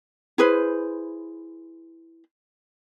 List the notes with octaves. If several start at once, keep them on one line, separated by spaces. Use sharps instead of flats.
E4 G#4 B4 C5